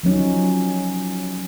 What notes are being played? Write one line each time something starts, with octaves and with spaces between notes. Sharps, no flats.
F3 F#3 C#4 D#4